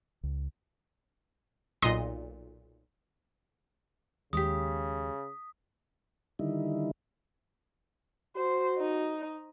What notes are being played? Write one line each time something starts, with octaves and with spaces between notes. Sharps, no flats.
C#2
B1 A#2 D#5 C6
D#2 C#3 G#3 G4 D#6 B6
D3 D#3 G3 D#4 E4
F#4 C5
D#4